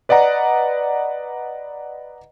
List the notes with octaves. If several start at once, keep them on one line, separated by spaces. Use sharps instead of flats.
B4 D5 D#5 F#5 A#5